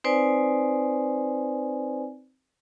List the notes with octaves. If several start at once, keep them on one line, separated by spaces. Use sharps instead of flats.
C4 D#4 B4 C5 D5 G#5